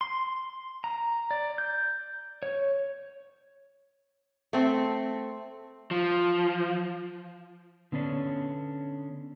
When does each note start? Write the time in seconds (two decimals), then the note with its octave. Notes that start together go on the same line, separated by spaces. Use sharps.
0.01 C6
0.84 A#5
1.31 D5
1.58 G6
2.43 C#5
4.53 A3 C4
5.91 F3
7.92 D3 B3 C#4 D4